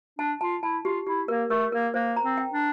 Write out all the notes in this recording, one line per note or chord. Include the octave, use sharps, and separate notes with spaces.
D4 A5
F4 A5
E4 A5
F4 G4
E4 G4
A#3 A#4
A3 A#4
A#3 A#4
A#3 C5
A#5
C4
G5
D4